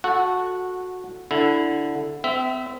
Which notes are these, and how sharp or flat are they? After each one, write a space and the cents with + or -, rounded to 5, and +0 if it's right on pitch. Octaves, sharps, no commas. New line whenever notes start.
F#4 -15 A4 -5 F#5 +0
D3 +0 E4 +0
C4 -40 E5 +0